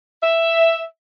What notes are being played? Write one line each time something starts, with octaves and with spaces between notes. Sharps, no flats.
E5